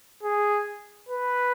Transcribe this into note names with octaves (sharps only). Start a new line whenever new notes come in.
G#4
B4